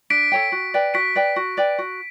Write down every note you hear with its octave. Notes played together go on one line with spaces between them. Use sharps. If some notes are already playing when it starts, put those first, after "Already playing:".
D4 B6 D7
A4 C#5 G5
F#4
B4 D5 G5
F#4 B6 D7
B4 D5 G5
F#4
B4 D5 G5
F#4